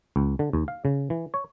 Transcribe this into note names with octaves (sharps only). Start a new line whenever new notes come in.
C#2
D3
D#2
F5
C#3
E3
C#5